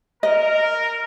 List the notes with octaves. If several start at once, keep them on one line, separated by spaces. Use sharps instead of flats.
A#4 D#5